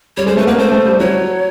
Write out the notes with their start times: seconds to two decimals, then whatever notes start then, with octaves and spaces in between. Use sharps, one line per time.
0.17 G3 C#5
0.27 G#3 C5
0.37 A3 B4
0.47 A#3 B4
0.58 A3 C5
0.72 A3
0.86 G3
0.99 F#3 C#5